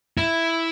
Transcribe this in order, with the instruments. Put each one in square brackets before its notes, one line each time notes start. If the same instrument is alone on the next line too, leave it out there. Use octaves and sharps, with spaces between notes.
[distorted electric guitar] E4